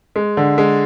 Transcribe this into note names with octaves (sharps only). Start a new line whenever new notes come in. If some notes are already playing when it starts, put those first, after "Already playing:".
G#3
D3
G#3